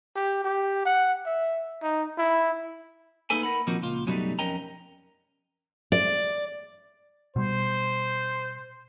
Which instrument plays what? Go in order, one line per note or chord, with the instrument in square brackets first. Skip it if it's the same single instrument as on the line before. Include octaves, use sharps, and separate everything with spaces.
[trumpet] G4
G4
F#5
E5
D#4
E4
[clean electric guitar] A#3 D#4 E4 A4 B4 G#5
A#4 F#5 B5
A#2 D#3 F3 C4 D#4 F#4
C#2 A#2 F4
F#2 B2 F#3 G3 A3 D#4
F2 C#4 A#4 D#5 G5 A#5
[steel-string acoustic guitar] D5
[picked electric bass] B2 G3 [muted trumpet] C5